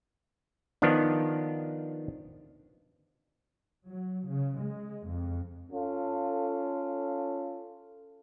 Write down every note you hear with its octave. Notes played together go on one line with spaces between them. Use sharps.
D#3 F3 B3 D4
F#3
C#3
G#3
F2
C#4 F4 A4